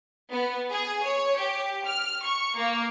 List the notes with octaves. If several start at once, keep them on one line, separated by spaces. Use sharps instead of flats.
B3
G#4
C#5
G4
F6
C#6
A#3